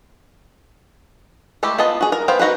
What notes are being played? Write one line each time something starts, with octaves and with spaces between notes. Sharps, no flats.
G#3 A3 E4 G4
B3 F4 D#5 A5
F#4 G#4
A#4
B3 C5 F5 G5
D#4 F#4 A#4 B4